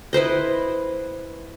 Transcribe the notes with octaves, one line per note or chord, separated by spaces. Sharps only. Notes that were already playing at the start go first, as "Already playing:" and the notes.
E4 B4 C5 D#5